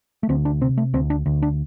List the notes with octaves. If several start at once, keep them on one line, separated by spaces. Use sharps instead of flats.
A3
D2 C4
D4
C3 C4
A3
D2 C4
D4
D2
D4